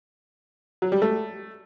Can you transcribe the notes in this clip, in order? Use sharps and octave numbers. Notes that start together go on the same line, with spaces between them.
F#3
G3
A3